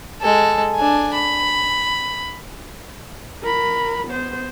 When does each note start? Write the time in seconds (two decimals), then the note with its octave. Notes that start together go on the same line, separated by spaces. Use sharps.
0.22 G#3 A4
0.76 D4 G#5
1.14 B5
3.42 A#4 B5
4.07 B3 C5